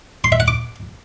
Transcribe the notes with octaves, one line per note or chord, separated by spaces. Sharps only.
C6
E5
F#5
D6